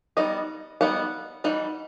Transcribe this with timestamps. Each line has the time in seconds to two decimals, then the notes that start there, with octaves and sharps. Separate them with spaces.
0.17 G3 B3 D#4 D#5
0.81 G3 B3 D#4 F#5
1.44 E3 G3 D#4 F#5